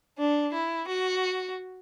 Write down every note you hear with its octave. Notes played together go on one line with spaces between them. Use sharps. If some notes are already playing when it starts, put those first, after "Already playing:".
D4
E4
F#4